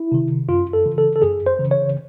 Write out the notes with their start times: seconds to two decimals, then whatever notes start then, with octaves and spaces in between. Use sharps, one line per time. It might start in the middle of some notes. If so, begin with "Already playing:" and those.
Already playing: E4
0.12 C3 D#3
0.48 F#2 F4
0.73 A4
0.86 C#3 E3
0.98 A4
1.16 A4
1.22 F#2 G#4
1.46 C5
1.59 C#3 E3
1.71 C#5